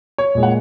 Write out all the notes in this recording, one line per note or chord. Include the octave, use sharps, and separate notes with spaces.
C#5
A#2 G#3
F#5